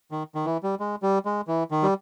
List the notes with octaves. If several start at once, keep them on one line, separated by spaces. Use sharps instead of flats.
D#3
D#3
E3
G3
G#3
G3
G#3
E3
D#3
G3